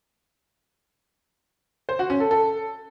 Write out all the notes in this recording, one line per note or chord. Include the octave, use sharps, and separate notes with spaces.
C5
F#4
C#4
A4
A4